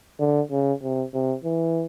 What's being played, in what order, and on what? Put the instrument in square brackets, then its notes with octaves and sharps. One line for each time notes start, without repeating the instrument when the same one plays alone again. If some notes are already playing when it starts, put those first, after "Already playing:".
[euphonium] D3
C#3
C3
C3
E3